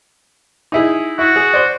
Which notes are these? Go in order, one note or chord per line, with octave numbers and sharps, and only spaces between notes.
D#4 E4 G#4
E4 F#4
G#4
C5 D5